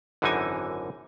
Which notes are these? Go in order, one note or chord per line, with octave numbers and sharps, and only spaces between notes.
G#1 F#2 D3 E3 D#4 G#5